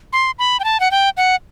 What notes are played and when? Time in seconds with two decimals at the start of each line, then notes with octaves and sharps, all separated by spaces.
0.13 C6
0.39 B5
0.60 G5
0.64 A5
0.80 F#5
0.91 G5
1.17 F#5